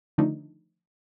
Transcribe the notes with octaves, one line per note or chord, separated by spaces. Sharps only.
D3 D#3 F3 A3 D4 D#4